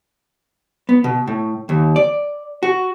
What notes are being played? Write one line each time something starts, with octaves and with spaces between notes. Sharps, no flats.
B3
B2
A2
D#2
D5
F#4